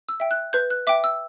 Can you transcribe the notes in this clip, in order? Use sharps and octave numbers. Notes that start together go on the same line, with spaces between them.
E6
E5 G5
F#6
B4 G6
F#6
E5 G5 D6
E6